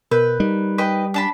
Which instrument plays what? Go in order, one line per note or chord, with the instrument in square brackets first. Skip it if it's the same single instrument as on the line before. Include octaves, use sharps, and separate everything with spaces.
[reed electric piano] B2 G6 [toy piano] A#4 [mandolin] B4
[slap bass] G3 [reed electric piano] D#4
[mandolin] B4 D#5 G5
D4 A5 B5